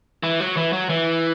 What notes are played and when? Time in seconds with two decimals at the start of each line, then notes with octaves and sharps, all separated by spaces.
0.23 E3
0.40 F#3
0.57 E3
0.73 F#3
0.89 E3